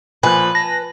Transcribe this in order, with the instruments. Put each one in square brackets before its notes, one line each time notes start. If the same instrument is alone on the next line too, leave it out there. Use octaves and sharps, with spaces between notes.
[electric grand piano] A#2 F3 [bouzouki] B4 [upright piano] G#5 F#6
[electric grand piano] A5 [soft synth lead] A#6